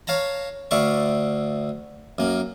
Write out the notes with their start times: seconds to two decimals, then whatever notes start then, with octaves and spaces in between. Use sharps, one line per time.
0.07 C#5 F5 A5 A#5
0.71 D2 D3 D5 E5 F5 C#6
2.18 F#2 A#3